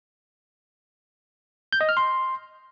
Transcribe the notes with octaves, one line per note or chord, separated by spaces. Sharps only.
G6
D#5
F6
C6